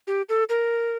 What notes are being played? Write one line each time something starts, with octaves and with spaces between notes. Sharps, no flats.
G4
A4
A#4